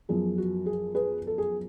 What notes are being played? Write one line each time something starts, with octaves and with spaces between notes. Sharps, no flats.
F#2 F3 B3 G#4
F#4
G#4
G#4 B4
A4
G#4